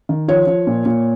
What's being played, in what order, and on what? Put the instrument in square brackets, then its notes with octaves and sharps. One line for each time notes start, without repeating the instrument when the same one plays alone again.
[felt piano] D#3
F3 C#5
F3
A#2
A#2